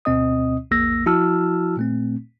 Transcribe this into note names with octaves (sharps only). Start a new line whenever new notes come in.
D2 B2 C4 D#5 D#6
A#1 E2 A#3 E6 A#6
F3 E4 F#4 A5 E6 F6
A#2 A3 C4